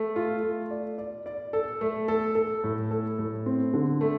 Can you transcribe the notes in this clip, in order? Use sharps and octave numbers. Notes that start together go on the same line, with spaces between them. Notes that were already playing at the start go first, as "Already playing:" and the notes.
Already playing: A3
F4
A3
D5
D5
D5
A4
A3
A4
A4
A2
A4
A2
C4
D3
A3